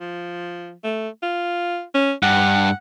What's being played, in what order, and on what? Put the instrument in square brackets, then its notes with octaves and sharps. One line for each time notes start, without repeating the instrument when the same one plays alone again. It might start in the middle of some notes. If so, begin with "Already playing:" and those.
[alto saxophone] F3
A3
F4
C#4
[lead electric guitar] G2 [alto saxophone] F#5